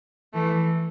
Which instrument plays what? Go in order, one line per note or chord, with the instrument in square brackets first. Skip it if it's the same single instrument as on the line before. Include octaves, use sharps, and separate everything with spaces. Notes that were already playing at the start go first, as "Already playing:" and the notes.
[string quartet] E3 A3